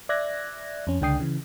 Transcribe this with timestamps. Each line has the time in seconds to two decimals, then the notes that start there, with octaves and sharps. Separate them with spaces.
0.09 D5 E5 F#6 G#6 A#6
0.87 F2 C#4
1.01 C#2 D3 D4 G5 D#6 C7
1.20 C#3 E3